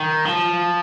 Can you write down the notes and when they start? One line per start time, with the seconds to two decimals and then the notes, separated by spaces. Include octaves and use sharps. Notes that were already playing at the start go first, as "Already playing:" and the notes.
Already playing: D#3
0.25 F3